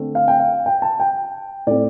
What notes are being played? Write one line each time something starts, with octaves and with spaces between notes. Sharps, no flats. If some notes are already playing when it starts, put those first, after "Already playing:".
Already playing: D3 A3 C4
F5
G5
F5
G5
A5
G5
A2 A3 C4 D5